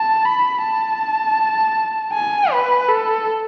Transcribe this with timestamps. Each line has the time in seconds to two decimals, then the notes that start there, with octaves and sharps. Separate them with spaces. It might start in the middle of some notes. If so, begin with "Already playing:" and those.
Already playing: A5
0.25 B5
0.63 A5
2.13 G#5
2.52 B4
2.89 A4